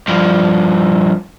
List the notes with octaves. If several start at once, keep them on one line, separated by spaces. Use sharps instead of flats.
G2 F3